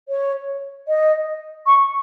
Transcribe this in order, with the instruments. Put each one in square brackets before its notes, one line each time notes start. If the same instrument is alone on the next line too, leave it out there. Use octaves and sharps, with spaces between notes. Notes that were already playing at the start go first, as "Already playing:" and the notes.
[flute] C#5
D#5
C#6